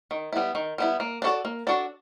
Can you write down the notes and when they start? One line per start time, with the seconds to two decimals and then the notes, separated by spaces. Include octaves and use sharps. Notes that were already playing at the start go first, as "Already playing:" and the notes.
0.11 D#3
0.33 G3 B3 E4
0.55 D#3
0.78 G3 B3 E4
1.00 A#3
1.22 D4 F#4 A4 D5
1.45 A#3
1.67 D4 F#4 A4 D5